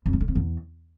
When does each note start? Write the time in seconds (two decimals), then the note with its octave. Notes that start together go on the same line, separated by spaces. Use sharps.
0.06 F2
0.13 G2
0.21 D3
0.28 C3
0.35 E2